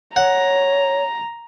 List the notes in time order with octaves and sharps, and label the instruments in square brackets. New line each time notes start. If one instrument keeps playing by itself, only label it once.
[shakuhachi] C#5 [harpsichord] F#5 [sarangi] A#5